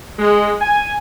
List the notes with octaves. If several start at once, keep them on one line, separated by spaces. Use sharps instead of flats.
G#3
G#5